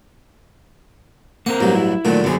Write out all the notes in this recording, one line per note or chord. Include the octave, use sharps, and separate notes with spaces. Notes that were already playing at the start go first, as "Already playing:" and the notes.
A#3 C4 A#4 F#5
A1 G2 F#3
E4
A#2 D3 D#3 F#3 A3
F#2 D3 B3 C4 G#4